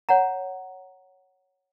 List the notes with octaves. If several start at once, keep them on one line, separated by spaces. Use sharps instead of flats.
C#5 F#5 A#5